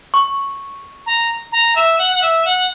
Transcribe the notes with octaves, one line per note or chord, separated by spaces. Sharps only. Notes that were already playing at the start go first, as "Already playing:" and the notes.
C#6
A#5
A#5
E5
F#5
F#5
E5
F#5